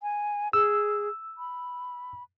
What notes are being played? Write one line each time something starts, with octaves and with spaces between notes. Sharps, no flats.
G#5
G#4 E6
B5